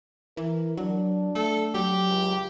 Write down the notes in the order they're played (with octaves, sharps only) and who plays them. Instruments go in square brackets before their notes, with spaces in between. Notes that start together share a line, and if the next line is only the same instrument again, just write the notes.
[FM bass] E3 [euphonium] A#4
[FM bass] F#3 [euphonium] D4
[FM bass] A3 [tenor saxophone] A4
[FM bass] F#3 [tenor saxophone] G4
[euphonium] C#2